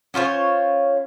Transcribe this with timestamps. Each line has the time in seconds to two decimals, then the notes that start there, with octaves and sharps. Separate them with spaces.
0.14 C#4 F4 C5 C#5